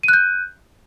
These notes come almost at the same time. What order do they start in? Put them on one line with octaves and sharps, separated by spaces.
D#7 F#6 G6